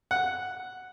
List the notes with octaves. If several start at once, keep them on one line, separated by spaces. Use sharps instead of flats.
F#5